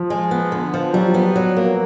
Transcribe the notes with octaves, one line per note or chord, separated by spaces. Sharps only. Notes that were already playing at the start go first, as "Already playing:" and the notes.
Already playing: F3
G#3
B3
D3
F3
F#3 G3
B3
F#3
A#3